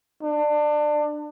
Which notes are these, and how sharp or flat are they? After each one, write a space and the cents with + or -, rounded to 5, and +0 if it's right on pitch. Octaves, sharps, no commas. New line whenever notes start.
D4 +25